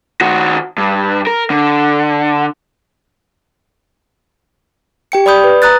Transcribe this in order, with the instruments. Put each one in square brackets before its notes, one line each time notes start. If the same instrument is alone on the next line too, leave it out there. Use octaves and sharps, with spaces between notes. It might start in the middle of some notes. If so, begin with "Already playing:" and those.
[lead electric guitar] D#3 F#4
G2
A#4
D3
[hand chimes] G4 G5 C#7
D5 B5 D#6 G6
B4
A#5 D#6 F#6 A6